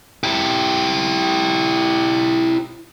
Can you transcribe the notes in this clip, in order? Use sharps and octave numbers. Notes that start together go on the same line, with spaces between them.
E4 G4